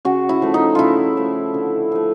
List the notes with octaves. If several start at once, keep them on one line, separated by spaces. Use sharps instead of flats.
C#3 F#4
E4
F3 A3
D#4
C#3 E4 F4
F3 A3
D3
F3 A3